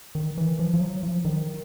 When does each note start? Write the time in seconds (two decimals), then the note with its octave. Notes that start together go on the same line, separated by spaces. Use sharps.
0.15 D#3
0.38 E3
0.59 F3
0.74 F3
0.81 F#3
1.03 F3
1.25 D#3